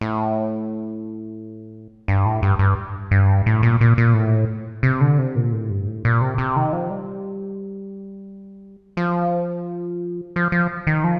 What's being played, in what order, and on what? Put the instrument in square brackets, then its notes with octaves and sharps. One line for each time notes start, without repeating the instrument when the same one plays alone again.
[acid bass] A2
G2
A2
G2
G2
G2
A2
A#2
A#2
A#2
A2
C3
D3
C3
A#2
A2
G2
A2
A#2
C3
C3
D#3
F3
G3
F3
F3
F3
D#3
F3